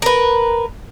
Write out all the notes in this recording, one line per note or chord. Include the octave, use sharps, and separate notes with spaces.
A#4 B4